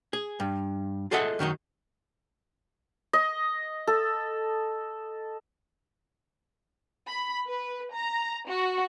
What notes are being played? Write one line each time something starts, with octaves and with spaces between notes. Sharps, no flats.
G#4
G2
F4 G#4 A4 D#5 E5 F#5
F#2 D#3 F#3 D#4
D#5
A4
B5
B4
A#5
F#4